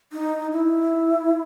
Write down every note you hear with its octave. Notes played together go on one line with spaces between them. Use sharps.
D#4
E4